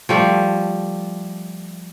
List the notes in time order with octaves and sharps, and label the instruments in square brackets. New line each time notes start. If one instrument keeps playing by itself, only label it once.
[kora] F3 G3 A3